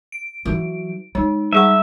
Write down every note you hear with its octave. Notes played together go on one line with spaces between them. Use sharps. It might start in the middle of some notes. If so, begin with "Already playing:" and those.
D7
E3 F#3
G#3 D#4
G3 G#4 E5 F#5